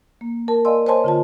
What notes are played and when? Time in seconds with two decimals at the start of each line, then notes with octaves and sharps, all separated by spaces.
0.21 A#3
0.48 A#4 A5
0.65 D5 D#5 F5 G#5 C6 E6
0.87 C5 C#5 D#5 G#5 A5 C6
1.04 D3 F4 A5